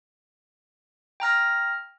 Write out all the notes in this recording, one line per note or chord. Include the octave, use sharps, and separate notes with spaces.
G5 A#5 F6 A#6